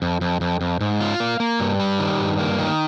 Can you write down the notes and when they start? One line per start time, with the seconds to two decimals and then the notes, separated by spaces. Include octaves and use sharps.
0.02 F2
0.21 F2
0.41 F2
0.61 F2
0.81 G#2
1.01 F4
1.20 A#3
1.40 A#3
1.60 G2
1.80 G3
1.99 D#3
2.20 G2
2.39 A#3
2.59 D#3